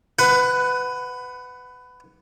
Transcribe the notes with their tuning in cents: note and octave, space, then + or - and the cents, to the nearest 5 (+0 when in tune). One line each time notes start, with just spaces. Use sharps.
B4 +20 F#5 +0